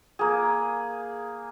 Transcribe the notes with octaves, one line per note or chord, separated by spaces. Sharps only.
A#3 G#4